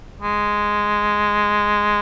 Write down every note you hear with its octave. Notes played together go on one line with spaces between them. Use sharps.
G#3